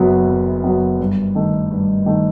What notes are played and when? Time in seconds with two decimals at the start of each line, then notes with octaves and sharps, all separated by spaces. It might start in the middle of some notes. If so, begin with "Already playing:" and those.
Already playing: F#1 F#2 F#3 B3
0.28 F#1
0.64 F#2 F#3 B3
1.00 G2
1.35 D#3 A3
1.71 G2
2.06 D#3 A3